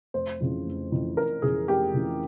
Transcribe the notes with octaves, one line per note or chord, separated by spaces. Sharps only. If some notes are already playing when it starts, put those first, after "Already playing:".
F1 C5
F2 C#3 E3
F1
F2 C#3 E3
F1 A#4
F2 C#3 E3 G#4
F1 G4
F2 C#3 E3